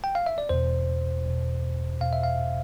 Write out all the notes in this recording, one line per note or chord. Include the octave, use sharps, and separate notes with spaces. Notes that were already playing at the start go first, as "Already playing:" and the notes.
G5
F5
E5
D5
E2 B2 C5
E2 B2
E2 B2 F5
E5
F5